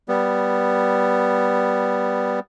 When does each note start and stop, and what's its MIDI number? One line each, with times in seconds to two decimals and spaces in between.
0.09 2.40 55
0.09 2.40 59